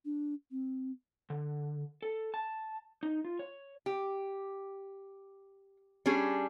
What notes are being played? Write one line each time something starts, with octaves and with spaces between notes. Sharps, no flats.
D4
C4
D3
A4
A5
D#4
F4
C#5
G4
G3 C#4 D4 G#4